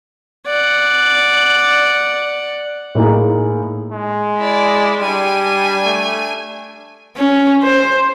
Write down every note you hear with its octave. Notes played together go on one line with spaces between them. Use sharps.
D5 F#5
A2 A#3 D#4 G#4
G#3
E4 D5
G3 D4 G#5
A3
C#4
C5